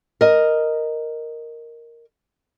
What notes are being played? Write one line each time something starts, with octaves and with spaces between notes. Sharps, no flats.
A#4 D#5